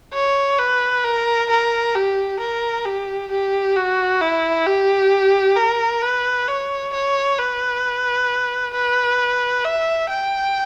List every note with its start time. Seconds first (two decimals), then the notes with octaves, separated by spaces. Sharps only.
0.13 C#5
0.59 B4
1.04 A#4
1.50 A#4
1.95 G4
2.40 A#4
2.85 G4
3.31 G4
3.75 F#4
4.21 E4
4.66 G4
5.56 A#4
6.02 B4
6.47 C#5
6.93 C#5
7.38 B4
8.74 B4
9.64 E5
10.10 G5